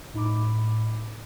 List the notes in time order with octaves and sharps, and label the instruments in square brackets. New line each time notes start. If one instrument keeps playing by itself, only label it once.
[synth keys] A2 D#4 B5 D6